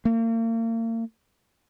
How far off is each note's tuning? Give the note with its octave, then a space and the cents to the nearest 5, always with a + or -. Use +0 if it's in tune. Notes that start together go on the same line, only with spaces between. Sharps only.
A#3 -40